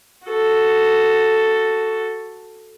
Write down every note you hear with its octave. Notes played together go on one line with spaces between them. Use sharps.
F#4 A4